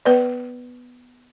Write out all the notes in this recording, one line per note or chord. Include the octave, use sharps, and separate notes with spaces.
B3 B4 D5